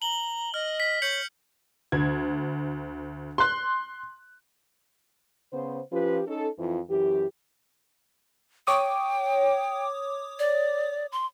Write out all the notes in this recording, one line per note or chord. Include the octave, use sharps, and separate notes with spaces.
A#5 F#7 G7
D#5 F6
B6
C#5 G6 C#7 F#7
D2 G#6
C6 F#6
C#3 B3 C5
F3 C#4 F4 G4 B4
C#4 D#4 A4
F2 E3 F3
F#2 E3 G4
C#5 G5 D6 D#6
D5
C6